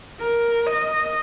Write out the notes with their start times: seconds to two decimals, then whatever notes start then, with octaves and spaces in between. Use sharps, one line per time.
0.20 A#4
0.67 D#5